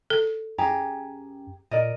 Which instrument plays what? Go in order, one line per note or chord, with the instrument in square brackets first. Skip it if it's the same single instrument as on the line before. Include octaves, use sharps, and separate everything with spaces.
[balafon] A4
[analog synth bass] F#2 [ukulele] G4 G#4 A#5
[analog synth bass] A#2 [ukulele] A#4 D5 D#5